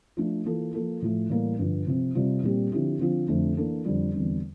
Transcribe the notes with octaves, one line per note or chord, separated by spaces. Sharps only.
F3 A3 D4
E3 A#3 F4 A4
F3 A#3 F4 A4
A2 F3 A3
A2 E3 G3 A#3
G2 D3 F3
C3 F3 C4
C3 G3 C4 F4
A#2 G3 C4 G4
D3 F3 C4 E4 G4
D3 F3 C4 F4
F2 D3 A3
E3 A#3 D4 A4
F2 D3 G3
E2 D3 G3 C4